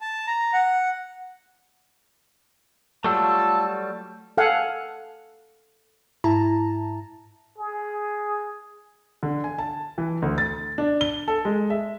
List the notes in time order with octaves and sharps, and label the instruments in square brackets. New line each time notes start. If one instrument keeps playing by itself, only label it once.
[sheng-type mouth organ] A5
A#5
F#5
[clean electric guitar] F#3 G3 A3 [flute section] F4 E6 [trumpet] A5
[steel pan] A4 F5 F#5 G#5
[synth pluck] G#2 E4 A5 A#5
[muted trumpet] G#4
[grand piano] D3
G#5
A5
E3
D2
A6
D4
G7
A4
G#3
E5